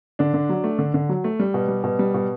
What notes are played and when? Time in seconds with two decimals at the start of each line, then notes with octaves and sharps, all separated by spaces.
0.19 D3 D4
0.34 D3
0.49 F#3
0.64 A3
0.79 D3
0.94 D3
1.09 F#3
1.24 A3
1.40 G3
1.54 B2
1.68 G3
1.84 B2
1.99 G3
2.14 B2